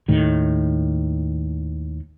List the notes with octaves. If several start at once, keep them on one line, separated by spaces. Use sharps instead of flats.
D#2 A2 D#3